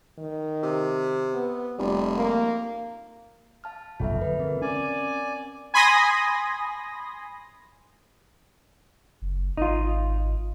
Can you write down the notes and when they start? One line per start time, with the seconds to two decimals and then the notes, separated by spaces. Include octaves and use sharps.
0.18 D#3
0.63 C3
1.32 B3
1.79 F1 G3
2.17 A#3
3.64 F5 A5 F6
4.00 F1 B1 G2 F4 A4 E5
4.21 D3 B4
4.40 C4 A#4
4.62 C#4 D5 G#5
5.74 G#5 B5 C6 D#6 A#6
9.22 F#1
9.57 G#1 D#4 F4